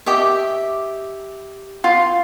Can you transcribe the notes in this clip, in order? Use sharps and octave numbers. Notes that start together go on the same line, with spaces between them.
G4 D#5 E5
F4